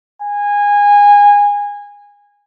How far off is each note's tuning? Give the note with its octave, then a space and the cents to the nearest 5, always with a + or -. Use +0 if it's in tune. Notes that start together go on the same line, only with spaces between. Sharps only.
G#5 -20